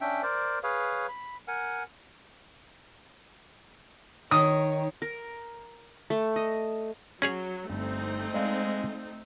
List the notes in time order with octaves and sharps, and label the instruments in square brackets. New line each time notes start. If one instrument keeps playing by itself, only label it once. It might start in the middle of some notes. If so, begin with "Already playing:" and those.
[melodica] C#4 D4 E5 G5
A#4 C5 D5
G#4 B4 C#5 F5
B5
A#4 F#5 G#5
[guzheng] D#3 [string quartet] C#5 [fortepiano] D#6
[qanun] A#4
A3
D#5
[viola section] F#3 [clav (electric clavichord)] C#4 G#4 C#5
[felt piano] G1 [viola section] A3 C4 D#4
[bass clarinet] G#3 [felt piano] D5 F5